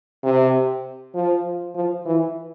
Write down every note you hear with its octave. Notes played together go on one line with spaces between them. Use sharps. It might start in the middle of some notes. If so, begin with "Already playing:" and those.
C3
F3
F3
E3